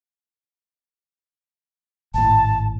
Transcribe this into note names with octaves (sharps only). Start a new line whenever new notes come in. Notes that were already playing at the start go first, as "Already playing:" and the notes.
G#1 A2 A5